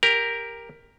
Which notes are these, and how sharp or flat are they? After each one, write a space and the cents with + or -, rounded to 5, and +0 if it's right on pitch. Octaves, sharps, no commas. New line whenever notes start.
G4 +20 A#4 +0